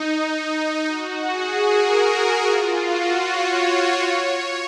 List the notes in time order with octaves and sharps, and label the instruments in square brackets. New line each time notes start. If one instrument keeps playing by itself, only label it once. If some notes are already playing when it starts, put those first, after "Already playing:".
Already playing: [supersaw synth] D#4
F#4
G#4
A#4
F4
F#4
C#5
C#5